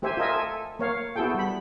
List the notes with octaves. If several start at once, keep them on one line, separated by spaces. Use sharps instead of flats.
A3 G4 C5 E5 G#5
F4 A4 A#4 D#5 E5 G#5
A4 G#5
A#3 C#5 F5
B3 E4 F#4 G#4 A4 G5
G3 B5